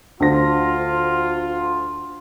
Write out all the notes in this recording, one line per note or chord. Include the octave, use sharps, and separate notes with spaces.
D2 F4 C5 A#6